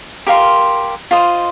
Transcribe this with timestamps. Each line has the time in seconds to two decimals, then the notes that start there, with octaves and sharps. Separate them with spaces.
0.27 G4 A#4 F5 C6
1.11 F4 C5 D#5